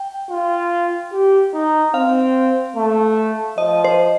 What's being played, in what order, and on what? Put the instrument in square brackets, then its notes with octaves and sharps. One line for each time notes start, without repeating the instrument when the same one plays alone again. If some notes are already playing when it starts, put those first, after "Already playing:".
Already playing: [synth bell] G5
[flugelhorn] F4
G4
D#4
[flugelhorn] C4 [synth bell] F5
[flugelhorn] A3
[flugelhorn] F3 [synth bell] D#5
[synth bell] C5